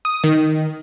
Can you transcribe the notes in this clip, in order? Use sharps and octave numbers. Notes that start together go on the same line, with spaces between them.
D#6
D#3